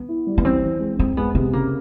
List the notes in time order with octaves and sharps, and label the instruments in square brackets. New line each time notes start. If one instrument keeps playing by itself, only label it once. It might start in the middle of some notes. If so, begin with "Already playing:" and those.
Already playing: [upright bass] B3
[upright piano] E4
G3
[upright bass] B3
[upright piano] E3 [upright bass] C4
[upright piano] E3
G#3
[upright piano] F2 [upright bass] C4
[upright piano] G#3 [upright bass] B3
[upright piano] C3 [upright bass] B3
[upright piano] C#3 [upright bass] A#3